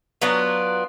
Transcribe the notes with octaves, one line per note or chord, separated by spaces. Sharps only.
F#3 B3 D4 F4